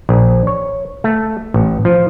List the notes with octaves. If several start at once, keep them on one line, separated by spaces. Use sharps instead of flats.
A#1
C#5
A3
A1
F3